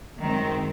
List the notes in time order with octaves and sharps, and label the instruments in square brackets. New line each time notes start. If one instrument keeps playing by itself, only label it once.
[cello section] F#2 D#3 G#3 C4